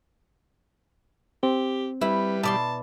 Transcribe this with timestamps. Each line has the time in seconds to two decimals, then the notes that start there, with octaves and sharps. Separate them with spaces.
1.43 C4 G4
2.01 G3 E4 B4
2.43 B2 D5 A5 C6